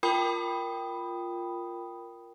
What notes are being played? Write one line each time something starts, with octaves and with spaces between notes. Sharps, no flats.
F4 A#4 G5 B5 D#6